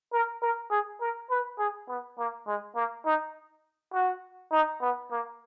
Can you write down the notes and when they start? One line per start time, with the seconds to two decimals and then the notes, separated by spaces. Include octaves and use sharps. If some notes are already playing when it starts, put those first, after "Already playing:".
0.12 A#4
0.42 A#4
0.70 G#4
1.00 A#4
1.30 B4
1.59 G#4
1.88 B3
2.18 A#3
2.47 G#3
2.75 A#3
3.06 D#4
3.93 F#4
4.52 D#4
4.81 B3
5.11 A#3